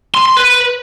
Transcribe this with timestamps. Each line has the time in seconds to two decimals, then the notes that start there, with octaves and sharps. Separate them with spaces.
0.14 C6
0.26 C6
0.37 B4